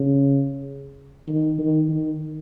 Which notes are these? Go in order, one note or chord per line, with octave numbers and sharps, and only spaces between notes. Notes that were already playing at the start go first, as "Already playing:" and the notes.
Already playing: C#3
D#3
D#3
D#3